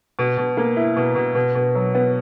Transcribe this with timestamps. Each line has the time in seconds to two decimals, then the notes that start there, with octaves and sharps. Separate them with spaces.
0.19 B2
0.38 B2
0.57 A#3
0.77 E4
0.96 B2
1.15 B2
1.35 B2
1.55 B2
1.75 F#3
1.95 B3